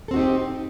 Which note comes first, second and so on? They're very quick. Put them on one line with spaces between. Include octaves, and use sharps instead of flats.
A4 C4 F#4 D#4 G4